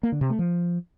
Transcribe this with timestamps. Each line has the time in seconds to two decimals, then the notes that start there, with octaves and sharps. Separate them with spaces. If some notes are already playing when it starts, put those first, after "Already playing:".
0.03 A#3
0.12 D3
0.21 C3
0.30 A3
0.39 F3